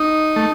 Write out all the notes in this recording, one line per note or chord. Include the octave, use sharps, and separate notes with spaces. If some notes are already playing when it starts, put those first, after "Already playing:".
Already playing: D#4
A3